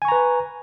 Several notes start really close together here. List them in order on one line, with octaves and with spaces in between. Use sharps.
G#5 C#6 A#5 B4